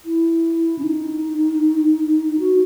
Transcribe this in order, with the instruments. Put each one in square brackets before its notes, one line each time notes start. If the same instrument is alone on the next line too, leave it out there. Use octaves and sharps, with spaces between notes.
[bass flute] E4
C#4
D#4
F#4